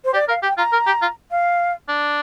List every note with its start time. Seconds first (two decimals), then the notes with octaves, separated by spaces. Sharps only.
0.05 C5
0.14 G4 D5
0.28 A#4 F5
0.43 G4 G5
0.58 F4 A#5
0.73 A#4
0.87 G4
1.02 F4
1.31 F5
1.88 D4